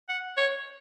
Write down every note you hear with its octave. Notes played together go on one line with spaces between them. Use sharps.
F#5
C#5